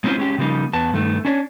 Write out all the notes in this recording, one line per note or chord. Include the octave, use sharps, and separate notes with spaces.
G#3 C4 C#4 E4 F4 C5
G#3 C#4 G4
C#3 F3 G3 A#3 D#4
E2 B3 A5
G2 D#3 A3
C#4 D4 C#5